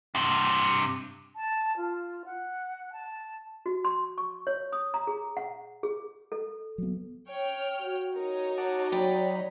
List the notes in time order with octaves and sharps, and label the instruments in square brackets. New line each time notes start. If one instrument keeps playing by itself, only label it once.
[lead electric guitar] G2 C3
[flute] A5
F4
F#5
A5
[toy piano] F#4
C6
C#6
C#5
D#6
A#5
G#4
F#5
G#4
A4
[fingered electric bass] F#3 B3
[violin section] C#5 G5 F6
[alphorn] F#4
[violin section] D#4 C#5 [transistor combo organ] A#4
[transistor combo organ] F#5 A5 D6
[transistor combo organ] F#3 B5 [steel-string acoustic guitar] D5 G5